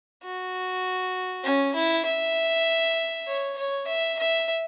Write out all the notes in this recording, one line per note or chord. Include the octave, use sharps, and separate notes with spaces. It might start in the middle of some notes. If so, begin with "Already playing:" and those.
F#4
C#4
E4
E5
C#5
C#5
E5
E5